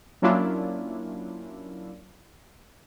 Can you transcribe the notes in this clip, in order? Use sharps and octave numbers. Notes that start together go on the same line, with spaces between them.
F#3 A#3 C#4 D4 E4 F4